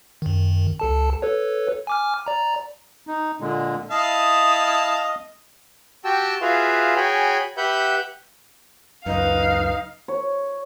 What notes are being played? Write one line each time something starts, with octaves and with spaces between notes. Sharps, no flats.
F#2 D#3
C#2 A4 A5
A4 B4 C#5
G#5 D6 F6
D5 A#5
D#4
A#2 D3 G#3
E4 D#5 F5 A5 D#6
F#4 G4 G5 A5 E6
F4 F#4 G#4 B4 E5 F5
F#4 G#4 C#5 G5 G#5 B5
G4 B4 E5 F#5 B5 G6
C#2 F#2 D#4 B4 F5
C#5